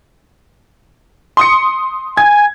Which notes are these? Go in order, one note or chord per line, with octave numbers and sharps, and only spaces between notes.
C6 D#6 C#7
G#5 G#6